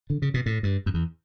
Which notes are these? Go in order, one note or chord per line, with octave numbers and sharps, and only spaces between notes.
D3
C#3
B2
A2
G2
F#2
E2